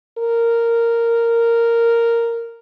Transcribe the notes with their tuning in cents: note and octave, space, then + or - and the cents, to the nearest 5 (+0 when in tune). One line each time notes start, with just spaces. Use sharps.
A#4 -5